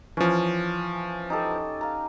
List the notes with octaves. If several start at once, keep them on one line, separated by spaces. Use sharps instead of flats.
E3 F3 C#4
D#4 G4 A4
F5 A#5